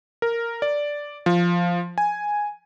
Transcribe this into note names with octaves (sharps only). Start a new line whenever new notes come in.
A#4
D5
F3
G#5